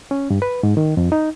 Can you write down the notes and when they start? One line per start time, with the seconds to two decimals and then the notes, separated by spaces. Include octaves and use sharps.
0.11 C#4
0.30 G2
0.42 B4
0.63 G#2
0.77 D#3
0.97 F2
1.12 D#4